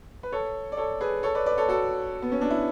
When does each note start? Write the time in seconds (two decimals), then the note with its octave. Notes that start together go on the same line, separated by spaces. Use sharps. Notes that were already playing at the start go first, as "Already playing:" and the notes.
0.23 B4
0.32 A4 C#5
0.72 D5
0.77 A4 C#5
1.01 G#4 B4
1.23 A4 C#5
1.35 B4 D5
1.46 B4 D5
1.58 A4 C#5
1.68 F#4 A4
2.22 B3
2.32 C#4
2.41 D4
2.51 E4